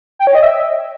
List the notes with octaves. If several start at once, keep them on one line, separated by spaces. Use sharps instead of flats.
G5
C#5
D#5
E5